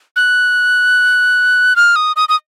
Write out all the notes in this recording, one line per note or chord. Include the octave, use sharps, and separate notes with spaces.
F#6
F6
D#6
D#6
D#6